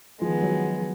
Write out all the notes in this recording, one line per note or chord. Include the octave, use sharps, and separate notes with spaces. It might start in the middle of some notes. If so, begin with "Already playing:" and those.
D#3 F3 G#3 B3
F#3